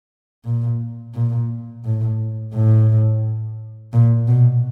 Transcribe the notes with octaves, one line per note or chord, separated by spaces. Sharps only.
A#2
A#2
A2
A2
A#2
B2